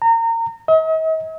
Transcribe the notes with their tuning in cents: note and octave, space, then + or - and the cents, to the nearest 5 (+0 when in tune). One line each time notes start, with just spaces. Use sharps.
A#5 -30
D#5 +45